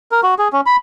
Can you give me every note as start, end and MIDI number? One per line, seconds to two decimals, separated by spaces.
0.11 0.21 70
0.23 0.34 66
0.38 0.48 68
0.53 0.61 61
0.66 0.76 83